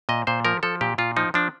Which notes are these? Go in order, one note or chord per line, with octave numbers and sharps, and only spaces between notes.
A#2 D#5
A#2 C5
F3 A#4
F3 A4
A#2 G4
A#2 F4
F3 D#4
F3 D4